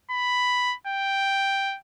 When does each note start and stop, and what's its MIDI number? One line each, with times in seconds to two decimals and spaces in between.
0.11 0.75 83
0.87 1.77 79